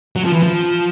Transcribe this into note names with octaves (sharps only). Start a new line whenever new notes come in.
F#3
F3
E3
F3